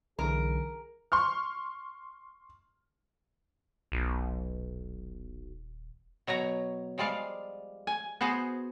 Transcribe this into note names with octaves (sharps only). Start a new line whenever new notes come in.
B1 D3 E3 G#4 A#4
C6 C#6 F6
D#1 B1
B2 F#3 C#5 A#5
F3 G3 G#3 D5 F5
G#5
B3 F#4 G#4 C5